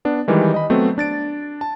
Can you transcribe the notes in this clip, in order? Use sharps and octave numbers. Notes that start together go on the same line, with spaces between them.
B3 D4
D#3 E3 G3 G#3 G4
D#5 B5
F#3 A3 B3 C4
D4 A6 D7
A5